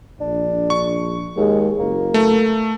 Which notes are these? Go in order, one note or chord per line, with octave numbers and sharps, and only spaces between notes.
A#1 D4
C#6
D#2 G#3
F#1 A#3
A3